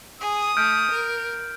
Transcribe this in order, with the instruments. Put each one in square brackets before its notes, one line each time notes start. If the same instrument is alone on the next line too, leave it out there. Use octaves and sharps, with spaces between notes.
[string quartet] G#4 [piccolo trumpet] D#6
[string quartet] A3 [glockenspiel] F6 G6 D7
[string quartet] A#4